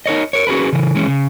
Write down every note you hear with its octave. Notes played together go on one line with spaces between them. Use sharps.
D#4 A#4 C#5 D#5
A#4 C#5
C#4 F#4 G#4 A#4 B4
C#3 E3
E3 G#3 C#4
C#3